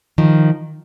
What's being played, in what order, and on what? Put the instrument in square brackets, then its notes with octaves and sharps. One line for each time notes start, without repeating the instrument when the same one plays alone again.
[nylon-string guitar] D#3 F3